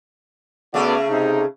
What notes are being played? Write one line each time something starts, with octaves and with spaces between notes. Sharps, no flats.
C#3 A3 B3 F#4 G#4 D5
C3 D#4